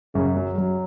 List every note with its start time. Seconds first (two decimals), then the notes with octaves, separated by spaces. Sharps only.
0.15 F#2 C#3
0.37 F#3
0.58 F#3